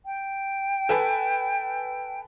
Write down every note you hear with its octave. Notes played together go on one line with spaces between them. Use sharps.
G5
A4 B4 G#5